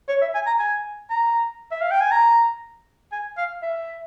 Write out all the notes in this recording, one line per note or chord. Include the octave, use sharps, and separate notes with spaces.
C#5
E5
G#5
A#5
G#5
A#5
E5
F5
G5
G#5
A#5
G#5
F5
E5